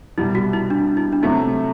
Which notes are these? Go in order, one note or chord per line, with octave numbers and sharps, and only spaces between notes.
C2 B2 G3 E4
F#4
E4
D4
E4
D4
C3 F#3 A3 E4